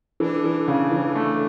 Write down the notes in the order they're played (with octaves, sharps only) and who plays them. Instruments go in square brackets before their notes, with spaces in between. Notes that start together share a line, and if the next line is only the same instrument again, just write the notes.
[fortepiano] E3 [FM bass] D4
[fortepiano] E3
C#3
E3
A3